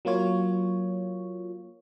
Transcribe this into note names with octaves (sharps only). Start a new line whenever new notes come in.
F#3 A#3 F4 C#5